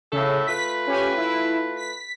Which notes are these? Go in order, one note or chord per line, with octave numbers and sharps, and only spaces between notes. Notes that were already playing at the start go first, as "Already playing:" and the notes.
A2 C#3 A4 E5
A3 F4 B4 B6
C#4 G4 G#5
E4
B6